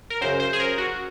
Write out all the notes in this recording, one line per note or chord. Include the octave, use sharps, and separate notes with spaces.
A#4
F#2 C#3 C5
C5
G#4
A#4
F#4